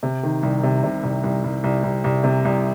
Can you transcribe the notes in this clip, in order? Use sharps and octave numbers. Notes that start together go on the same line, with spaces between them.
C3
D#3
C2
C3
C3
C2
C2
C2
C2
C2
C2
C3
C2